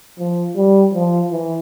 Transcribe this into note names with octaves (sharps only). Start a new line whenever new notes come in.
F3
G3
F3
E3